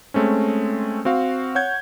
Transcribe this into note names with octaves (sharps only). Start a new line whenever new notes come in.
G#3 A3 C4 C#4
C4 F#4 F5
C#5 F#5 G6 G#6